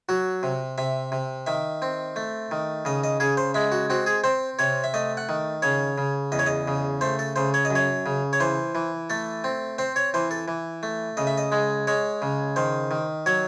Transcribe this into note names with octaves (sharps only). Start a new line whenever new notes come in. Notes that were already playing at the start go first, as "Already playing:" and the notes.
F#3 F#4
C3
C3 E5
C3
D#3 E5
C4
A3
D#3
C#3 D#5
D#5
C#3 G#4
C5
G#3 E5
F#4
C4 F#4
G#4
C4 C5
C3 C#5
E5
A3 D#5
F#5
D#3
C#3 C#5
C#3
E2 D#5
C#5
D#5
C#3
A3 C5
A4
C#3 C5
C#5
D#5
F#2
C#5
C#3
C#5
E3 C5
E3
A3 A4
C4
C4 C5
C#5
E3 C5
A4
E3
A3
C#3 D#5
E5
D#5
G#3
G#3 C#5
C#3
D#3 C5
D#3
F#3 C#5